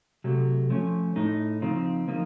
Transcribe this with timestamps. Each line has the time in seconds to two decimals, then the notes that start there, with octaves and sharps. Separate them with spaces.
0.24 C3 F#3 A3
0.70 F3 A3 C#4
1.16 A2 A3 D#4
1.62 C#3 F3 C4 D#4
2.08 F3 A#3 D#4